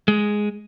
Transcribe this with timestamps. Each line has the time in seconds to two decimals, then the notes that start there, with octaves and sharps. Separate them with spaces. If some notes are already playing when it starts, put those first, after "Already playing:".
0.08 G#3